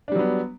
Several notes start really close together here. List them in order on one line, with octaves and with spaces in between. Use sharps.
D4 G3 F#3 B3